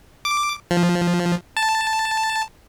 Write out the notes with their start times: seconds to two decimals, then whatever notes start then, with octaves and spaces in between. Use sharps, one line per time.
0.25 D6
0.71 F3
1.57 A5